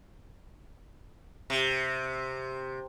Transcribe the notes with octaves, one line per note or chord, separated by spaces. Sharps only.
C3